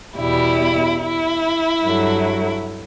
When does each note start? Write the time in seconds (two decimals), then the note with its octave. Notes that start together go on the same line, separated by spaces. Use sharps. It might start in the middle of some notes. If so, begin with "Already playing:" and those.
0.17 E2 B2 G3 E4
1.01 E4
1.85 G2 F#3 A3